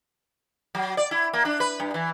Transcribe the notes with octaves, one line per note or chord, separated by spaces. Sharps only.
F#3
D5
E4
A#3
D4
B4
G2
E3